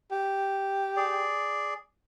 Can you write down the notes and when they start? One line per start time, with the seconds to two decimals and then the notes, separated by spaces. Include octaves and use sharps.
0.11 G4
0.97 G#4 D5